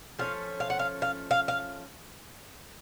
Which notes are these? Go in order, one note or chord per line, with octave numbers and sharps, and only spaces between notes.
F3 A3 C#4 F5
F5
F#5
F5
F5
F5
F5